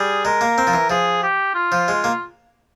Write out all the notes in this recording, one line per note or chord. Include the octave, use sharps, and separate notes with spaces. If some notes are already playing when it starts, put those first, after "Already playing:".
Already playing: G3 G#4
G#3 A#4
A#3
C4
F3
E3
F3 G#4
G4
F4
F3
G#3
A#3